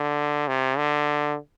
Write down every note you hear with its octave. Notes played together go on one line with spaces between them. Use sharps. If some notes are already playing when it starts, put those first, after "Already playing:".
Already playing: D3
C3
D3